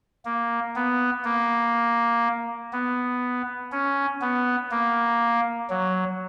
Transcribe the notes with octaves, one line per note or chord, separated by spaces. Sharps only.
A#3
B3
A#3
B3
C#4
B3
A#3
F#3